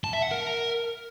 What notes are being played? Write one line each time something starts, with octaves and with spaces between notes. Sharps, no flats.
A5
E5
F#5
A#4